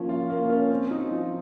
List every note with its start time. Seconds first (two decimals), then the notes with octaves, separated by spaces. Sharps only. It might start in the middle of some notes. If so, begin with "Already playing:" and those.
Already playing: F3 A#3 C#4
0.09 F4
0.30 A#3
0.50 C#4
0.70 C4
0.91 D#4
1.11 F3